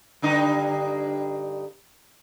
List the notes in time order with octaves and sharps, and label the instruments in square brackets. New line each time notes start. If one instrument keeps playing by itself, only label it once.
[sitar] G2 D3 D#4